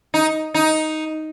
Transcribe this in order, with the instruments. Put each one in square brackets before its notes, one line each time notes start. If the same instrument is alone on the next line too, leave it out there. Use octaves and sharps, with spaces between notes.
[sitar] D#4
D#4